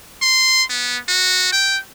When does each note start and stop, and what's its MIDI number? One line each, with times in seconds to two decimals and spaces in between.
0.22 0.62 84
0.70 0.97 59
1.09 1.52 66
1.52 1.79 79